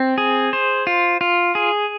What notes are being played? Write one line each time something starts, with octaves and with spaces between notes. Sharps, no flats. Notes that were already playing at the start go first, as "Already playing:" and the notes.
Already playing: C4
G#4
C5
F4
F4
G#4